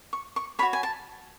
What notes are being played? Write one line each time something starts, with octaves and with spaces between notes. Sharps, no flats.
C#6
C#6
F#4 A4 C#5 B5
G#5
A5